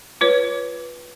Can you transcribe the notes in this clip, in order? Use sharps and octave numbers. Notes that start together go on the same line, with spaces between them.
F4 B4 C#5